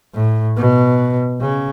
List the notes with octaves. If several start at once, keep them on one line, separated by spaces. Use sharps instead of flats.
A2
B2
C#3